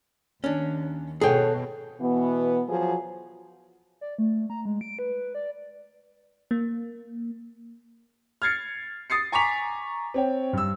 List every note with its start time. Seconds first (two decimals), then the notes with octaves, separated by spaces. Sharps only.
0.44 D#2 C#4 D4
1.21 B2 G#4 A4 C#5 F#5 G5
2.01 B2 E3 B3
2.68 F3 F#3 G#4
4.01 D5
4.18 A3
4.50 A#5
4.65 G#3
4.81 D7
4.99 B4
5.35 D5
6.51 A#3
8.42 F6 G#6 A6 C7 C#7
9.10 D#6 A6 C7 C#7
9.32 G#5 A#5 C#6 D6 B6 F7
10.14 C4 C#5 G5
10.53 G2 E6